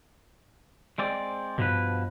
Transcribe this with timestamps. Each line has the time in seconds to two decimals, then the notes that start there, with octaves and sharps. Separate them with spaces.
0.98 G#3 C4 D5
1.58 G2 B2 F3 B4